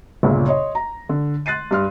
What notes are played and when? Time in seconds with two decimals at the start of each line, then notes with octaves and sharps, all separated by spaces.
0.23 G1 C#2 A#2 C#3
0.48 C#5 D#5 C6
0.75 A#5
1.09 D3
1.46 C6 F#6 A6 C7 D#7
1.71 G2 C6 F6